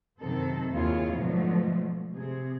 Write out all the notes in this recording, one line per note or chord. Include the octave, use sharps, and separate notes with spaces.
F#2 C3 D#3 C4 A4
D#2 E4 F4 G#4 C#5
G#2 B2 D3 F3 F#3 A3
C3 G#4